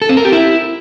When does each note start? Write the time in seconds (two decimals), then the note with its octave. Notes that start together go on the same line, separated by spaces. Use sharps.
0.02 A4
0.09 C4
0.17 A#4
0.25 G4
0.32 E4